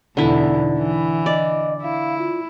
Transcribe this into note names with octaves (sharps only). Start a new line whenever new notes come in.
E2 B2 D3 D#4 E4
E3
D5 D#5
E4 F5
F4